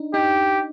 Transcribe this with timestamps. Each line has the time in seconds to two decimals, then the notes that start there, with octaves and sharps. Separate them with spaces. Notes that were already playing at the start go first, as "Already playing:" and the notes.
Already playing: D4 D#4
0.13 D#4 G4